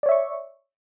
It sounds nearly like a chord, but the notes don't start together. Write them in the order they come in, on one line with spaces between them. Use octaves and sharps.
D5 C#5 E5 C#6